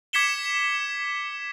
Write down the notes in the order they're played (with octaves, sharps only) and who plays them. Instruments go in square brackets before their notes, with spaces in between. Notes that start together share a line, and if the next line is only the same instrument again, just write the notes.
[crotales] D6 G#6 B6 C#7 E7 G7